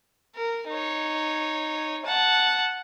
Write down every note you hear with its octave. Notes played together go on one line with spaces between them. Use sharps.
A#4
D#4 C#5
F#5 A5